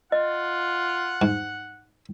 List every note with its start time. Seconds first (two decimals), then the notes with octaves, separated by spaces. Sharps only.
0.12 F4 D#5 F#5
1.22 G#2